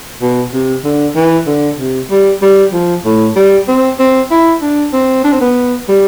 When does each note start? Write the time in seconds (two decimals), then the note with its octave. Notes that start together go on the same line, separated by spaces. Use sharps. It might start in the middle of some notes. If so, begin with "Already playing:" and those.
0.22 B2
0.53 C3
0.84 D3
1.16 E3
1.47 D3
1.79 C3
2.11 G3
2.42 G3
2.73 F3
3.05 A2
3.36 G3
3.68 C4
3.99 C4
4.31 E4
4.62 D4
4.93 C4
5.24 D4
5.32 C4
5.41 B3
5.89 G3